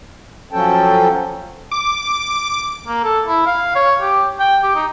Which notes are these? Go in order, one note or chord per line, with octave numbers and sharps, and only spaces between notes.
F3 F#3 C#4 A4 G5 A5
D6
A#3
A4
E4
F5
C#5
G4
G5
G4
D#4